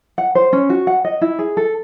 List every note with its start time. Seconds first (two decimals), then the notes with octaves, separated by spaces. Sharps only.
0.18 F#5
0.35 C5
0.53 C#4
0.70 F#4
0.87 F#5
1.05 D#5
1.21 E4
1.39 G#4
1.57 A4